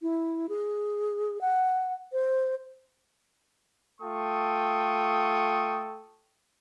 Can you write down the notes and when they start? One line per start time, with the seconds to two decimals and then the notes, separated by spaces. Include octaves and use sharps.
0.02 E4
0.49 G#4
1.41 F#5
2.13 C5
4.01 A3 F4 A4 G5 C#6 D#6